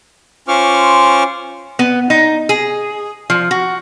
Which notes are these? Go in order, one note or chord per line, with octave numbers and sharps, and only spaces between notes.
C#4 F4 C5 C#6 D6 F6
B3
D#4
G#4
F3
F#4